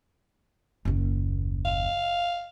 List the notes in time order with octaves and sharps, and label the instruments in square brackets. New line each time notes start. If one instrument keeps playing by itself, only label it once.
[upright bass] F#1 D#2
[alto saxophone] F5